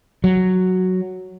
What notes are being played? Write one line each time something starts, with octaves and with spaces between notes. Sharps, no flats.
F#3